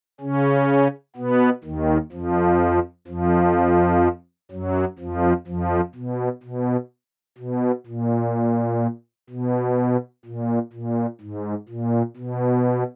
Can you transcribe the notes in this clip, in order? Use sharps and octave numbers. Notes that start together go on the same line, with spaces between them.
C#3 C#4
B2 B3
D#2 D#3
F2 F3
F2 F3
F#2 F#3
F2 F3
F2 F3
B2
B2
B2
A#2
B2
A#2
A#2
G#2
A#2
B2